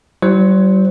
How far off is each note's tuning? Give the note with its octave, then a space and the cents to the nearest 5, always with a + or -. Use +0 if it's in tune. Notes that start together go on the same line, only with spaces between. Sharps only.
G3 -45 E4 +10 C5 +0